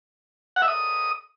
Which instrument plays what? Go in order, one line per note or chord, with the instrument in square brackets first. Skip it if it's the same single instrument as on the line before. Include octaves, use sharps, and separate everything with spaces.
[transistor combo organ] F#5
E5
D#6